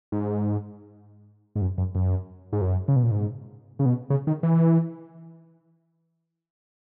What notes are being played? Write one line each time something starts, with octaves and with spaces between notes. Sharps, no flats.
G#2
G#2
F#2
F#2
F#2
G#2
F#2
C#3
B2
A#2
G#2
C#3
B2
C#3
D#3
E3